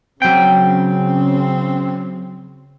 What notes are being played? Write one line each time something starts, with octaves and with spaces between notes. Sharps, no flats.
C#3 F#3 C4 G5